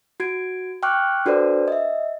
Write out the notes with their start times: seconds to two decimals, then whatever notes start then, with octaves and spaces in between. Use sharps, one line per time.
0.20 F#4 G#6 D7
0.83 G5 C#6 D6 F6 F#6
1.26 D4 F#4 A4 B4 C5 D5
1.68 D#5 E5